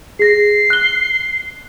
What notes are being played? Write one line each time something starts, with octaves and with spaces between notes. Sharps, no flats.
G#4 A#6 C7
F#6 G7